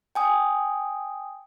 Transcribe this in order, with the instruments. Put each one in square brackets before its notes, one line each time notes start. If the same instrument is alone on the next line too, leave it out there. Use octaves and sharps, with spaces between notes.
[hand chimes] G5 G#5 D#6